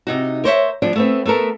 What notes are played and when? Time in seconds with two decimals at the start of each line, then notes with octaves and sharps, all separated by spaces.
0.07 C3 D#4 F#4
0.44 A#4 C5 C#5 E5
0.82 D2 F3 G3 D4
0.96 A3 B3 C4
1.26 A3 B3 A4 A#4